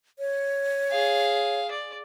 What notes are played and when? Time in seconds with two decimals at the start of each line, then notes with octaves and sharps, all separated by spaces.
0.19 C#5
0.91 G#4 F5
1.71 D5